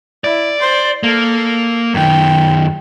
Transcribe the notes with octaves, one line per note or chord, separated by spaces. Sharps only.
E4 D5
C5
A#3 A4
F#2 D#3 G5